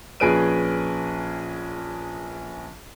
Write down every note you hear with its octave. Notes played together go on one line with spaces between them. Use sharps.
A#1 C#4 G#4 B4 D7 D#7